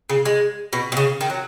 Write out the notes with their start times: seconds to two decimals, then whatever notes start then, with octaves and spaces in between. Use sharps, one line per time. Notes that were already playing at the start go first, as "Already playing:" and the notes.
0.10 C#3
0.25 G#3
0.73 B2
0.92 B2
0.97 C#3
1.21 D#3
1.30 F#3